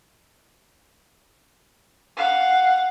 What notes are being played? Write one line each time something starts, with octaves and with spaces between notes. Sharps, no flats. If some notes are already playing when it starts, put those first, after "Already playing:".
F5 F#5